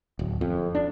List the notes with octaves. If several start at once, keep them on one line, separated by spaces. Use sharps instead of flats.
D1
F2
D4